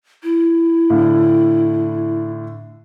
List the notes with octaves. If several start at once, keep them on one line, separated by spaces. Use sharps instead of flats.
E4
A2 D3 F5